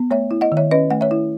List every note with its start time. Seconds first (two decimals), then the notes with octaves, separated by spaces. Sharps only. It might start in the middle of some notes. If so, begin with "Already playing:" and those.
Already playing: B3
0.11 A3 C#5 E5
0.31 E4
0.41 D#5 F#5
0.52 D#3
0.57 C#5 E5
0.71 C#4 B4 D#5
0.91 A3 F#5
1.01 C#5 E5
1.11 E4